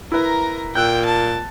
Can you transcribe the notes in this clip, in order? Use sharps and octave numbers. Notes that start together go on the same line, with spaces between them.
E4 A#4 B4 A#5
A#2 G5 E6 F#6 G6
A5